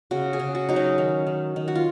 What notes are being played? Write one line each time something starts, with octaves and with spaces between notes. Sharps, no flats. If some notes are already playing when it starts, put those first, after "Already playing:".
C#3 F#4
G#4
C#3
F#4
F#3 D#4
C#4
D#3
D#3
D#3
F#4
F4